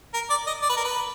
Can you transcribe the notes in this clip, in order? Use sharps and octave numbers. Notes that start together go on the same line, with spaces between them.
A#4
D5
D#5
D5
B4
A#4
B4